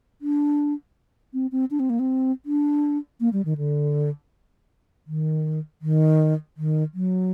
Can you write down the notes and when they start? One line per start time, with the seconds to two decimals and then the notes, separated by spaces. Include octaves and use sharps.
0.22 D4
1.34 C4
1.52 C4
1.71 D4
1.80 C4
1.90 A#3
1.99 C4
2.46 D4
3.20 A#3
3.33 G3
3.45 D#3
3.57 D3
5.07 D#3
5.82 D#3
6.57 D#3
6.94 F#3